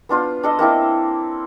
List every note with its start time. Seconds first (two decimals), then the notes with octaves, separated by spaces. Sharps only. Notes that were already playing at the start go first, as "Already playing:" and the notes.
0.09 B3 D4 F4 C5
0.43 D4 A4 D#5
0.59 A#3 C4 E4 A4